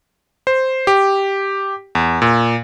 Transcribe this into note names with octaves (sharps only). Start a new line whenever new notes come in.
C5
G4
E2
A#2